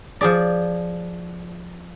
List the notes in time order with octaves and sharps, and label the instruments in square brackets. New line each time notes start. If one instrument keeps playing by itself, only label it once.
[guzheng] F3 G#4 D5